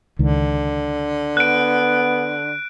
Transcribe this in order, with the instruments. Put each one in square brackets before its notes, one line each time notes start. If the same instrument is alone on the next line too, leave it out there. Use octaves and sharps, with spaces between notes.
[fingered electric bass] C#2 D#3 [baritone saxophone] D3
[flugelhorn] B3 [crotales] F#6 D7